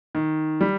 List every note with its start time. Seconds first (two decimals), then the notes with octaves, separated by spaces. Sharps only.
0.15 D#3
0.61 G3